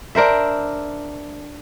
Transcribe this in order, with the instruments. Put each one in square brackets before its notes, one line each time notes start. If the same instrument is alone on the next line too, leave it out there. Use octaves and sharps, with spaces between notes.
[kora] D4 A#4 C5 E5